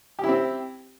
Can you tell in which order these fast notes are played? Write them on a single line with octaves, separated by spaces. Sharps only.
G4 E4 C4